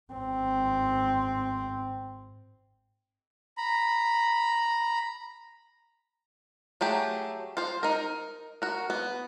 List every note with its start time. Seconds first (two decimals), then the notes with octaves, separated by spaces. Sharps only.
0.14 G#1 C4
3.57 A#5 B5
6.81 F#3 A3 G4 G#4
7.57 F4 C5
7.83 D#4 A#4
8.62 F#4 A#4
8.90 B3